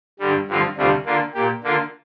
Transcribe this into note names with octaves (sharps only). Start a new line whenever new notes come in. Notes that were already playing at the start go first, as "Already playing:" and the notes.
G2 D3 G3
G2 D3 F3 C4 F4
D2 C3 G3 D4 F4
D3 A#3 F4
A#2 A#3 G4
D3 A#3 F4